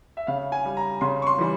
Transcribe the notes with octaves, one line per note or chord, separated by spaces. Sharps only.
E5
C#3 F5
G#5
G3
A#5
C#3 C6
C#6
C6
E3 G3